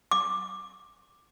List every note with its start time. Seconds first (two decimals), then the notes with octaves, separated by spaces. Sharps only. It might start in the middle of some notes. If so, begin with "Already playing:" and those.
0.11 D6